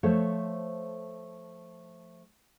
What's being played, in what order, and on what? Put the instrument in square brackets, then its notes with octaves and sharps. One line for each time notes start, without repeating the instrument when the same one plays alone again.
[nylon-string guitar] F3 A3 A4 C5 C#5